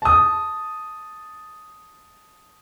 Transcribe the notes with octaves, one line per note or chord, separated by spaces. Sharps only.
A5 D#6